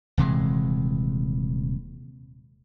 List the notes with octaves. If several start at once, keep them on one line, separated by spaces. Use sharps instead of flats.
D#1 C3 E3 G#3